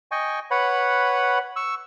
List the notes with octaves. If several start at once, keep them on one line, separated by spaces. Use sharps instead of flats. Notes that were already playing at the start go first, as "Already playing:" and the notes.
D#5 G5 G#5 C#6
B4 C#5 F#5 B5
C#6 E6